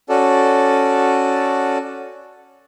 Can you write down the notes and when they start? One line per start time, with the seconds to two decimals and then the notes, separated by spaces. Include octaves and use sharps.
0.09 C#4 F#4 A4 D5